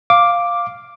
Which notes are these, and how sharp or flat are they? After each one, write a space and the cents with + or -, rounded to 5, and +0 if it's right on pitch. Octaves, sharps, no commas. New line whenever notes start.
F5 +0 D6 +0